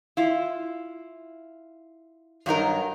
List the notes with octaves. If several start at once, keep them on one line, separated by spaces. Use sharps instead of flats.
E4 F4
G2 F#3 D#4 A#4